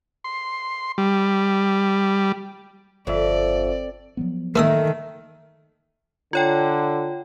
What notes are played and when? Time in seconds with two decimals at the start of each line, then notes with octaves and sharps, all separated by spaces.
0.24 C6
0.98 G3
3.07 G1 F2 D5 E5
4.17 F3 F#3 B3
4.56 D#3 A3 A#3 A4 D#6
6.33 D3 F4 C#5 G5